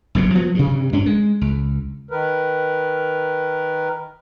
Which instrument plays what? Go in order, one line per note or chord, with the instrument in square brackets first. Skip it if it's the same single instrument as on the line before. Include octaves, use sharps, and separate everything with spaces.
[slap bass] F#1 B1 C3 F#3
F3 F#3 B3
G2 C3
G2 C#4 D4
G#3
C#2
[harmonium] D#3 A#4 B4